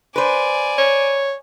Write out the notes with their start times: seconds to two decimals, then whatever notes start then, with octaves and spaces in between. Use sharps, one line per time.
0.16 B4 C5 D5 G#5
0.78 C#5